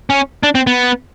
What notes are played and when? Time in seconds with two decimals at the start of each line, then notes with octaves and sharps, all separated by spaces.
0.10 C#4
0.43 D4
0.55 C4
0.67 B3